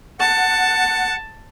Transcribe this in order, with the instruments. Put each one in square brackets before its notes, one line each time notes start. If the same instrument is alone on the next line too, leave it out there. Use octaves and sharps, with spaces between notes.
[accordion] F#5 [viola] A5